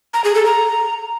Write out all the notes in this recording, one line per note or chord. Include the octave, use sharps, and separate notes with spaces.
A#5
G#4
A4
A#5